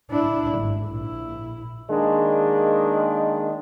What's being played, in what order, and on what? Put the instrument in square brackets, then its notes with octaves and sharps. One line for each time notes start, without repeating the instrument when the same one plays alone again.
[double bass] D4 E4
G#1
A#1 E4
[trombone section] D#3 G#3 A#3 D4